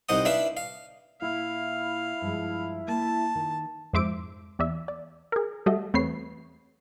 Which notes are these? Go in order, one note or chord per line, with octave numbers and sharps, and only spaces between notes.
C2 D#4 C5 F#5 D#6
D4 E4 B4 E5 F5
F5
A#2 E4 F5 F#5
G2 F3 G#3
A#3 A5
D#3
F2 G#2 C5 E5 D6 D7
E2 D5 E5
D5
G#4 A#4
G3 A3 F#4 A4 D#5 E5
E2 A3 C4 B4 C#5 C7